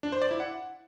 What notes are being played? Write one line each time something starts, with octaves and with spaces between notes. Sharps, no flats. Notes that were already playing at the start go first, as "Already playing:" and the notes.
D4
C5
D5
E4
F#5